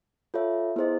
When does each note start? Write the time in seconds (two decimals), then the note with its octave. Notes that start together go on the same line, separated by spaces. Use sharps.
0.34 F4 A4 C#5 E5
0.76 B3 E4 G#4 C5 D#5